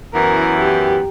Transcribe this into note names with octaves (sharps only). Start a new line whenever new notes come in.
F#2 E3 B3 E4 A#4
G4